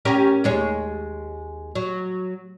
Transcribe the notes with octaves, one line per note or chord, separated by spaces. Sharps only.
C#4 G4 A#4
D#2 G#3 C#5
F#3